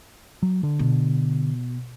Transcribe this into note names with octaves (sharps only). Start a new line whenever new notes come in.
F#3
D3
B2